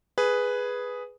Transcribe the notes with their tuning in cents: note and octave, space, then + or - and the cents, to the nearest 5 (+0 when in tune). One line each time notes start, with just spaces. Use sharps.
G#4 +0 B4 +0